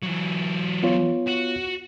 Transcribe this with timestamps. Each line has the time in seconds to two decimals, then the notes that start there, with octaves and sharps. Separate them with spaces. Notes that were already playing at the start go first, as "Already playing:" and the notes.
0.03 E3 F#3
0.83 B3 F4 C#5
1.27 F#4